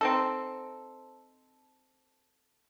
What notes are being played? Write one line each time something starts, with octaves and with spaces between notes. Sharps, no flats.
C4 D#4 A4